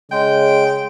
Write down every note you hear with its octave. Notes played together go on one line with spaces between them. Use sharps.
C#3 G#3 G5